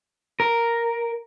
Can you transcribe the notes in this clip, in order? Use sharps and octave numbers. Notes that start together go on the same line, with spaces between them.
A#4